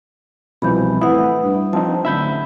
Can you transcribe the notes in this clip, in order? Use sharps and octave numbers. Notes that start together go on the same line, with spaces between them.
C2 B2 E3 F3 B5 G6
A2 E4 B4 F#5 D#6
G2
F3 C4 D#4 A5
A1 D3 F#3 E5 B5 G6